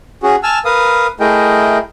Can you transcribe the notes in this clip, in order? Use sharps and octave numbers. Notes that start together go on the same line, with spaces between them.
C#4 F#4 G#4
G#5 A5 E6 F6
A#4 B4 F5 D#6
A3 E4 G#4 A#4 D#5 G5